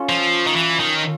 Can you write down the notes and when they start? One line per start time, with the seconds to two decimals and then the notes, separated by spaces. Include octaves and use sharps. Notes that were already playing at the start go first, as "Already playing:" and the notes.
Already playing: C#4 F4 A4
0.09 F3
0.47 D#3
0.56 E3
0.80 D#3